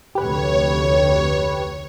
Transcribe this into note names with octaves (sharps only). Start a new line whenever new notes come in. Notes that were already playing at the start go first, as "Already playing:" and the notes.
F1 D2 G4 B4 C#5